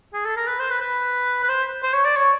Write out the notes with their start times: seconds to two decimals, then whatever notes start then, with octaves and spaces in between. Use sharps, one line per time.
0.13 G#4
0.25 A4
0.36 A#4
0.47 B4
0.59 C5
0.70 B4
0.81 B4
1.43 B4
1.49 C5
1.83 C5
1.93 C#5
2.05 D5
2.16 C#5